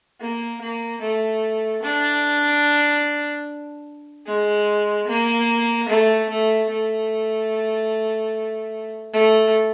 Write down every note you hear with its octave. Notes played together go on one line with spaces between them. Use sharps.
A#3
A#3
A3
D4
G#3
A#3
A3
A3
A3
A3